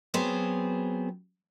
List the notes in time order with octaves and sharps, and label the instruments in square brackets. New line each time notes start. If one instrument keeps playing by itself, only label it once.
[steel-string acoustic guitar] F#3 B3 C4 G#4 C5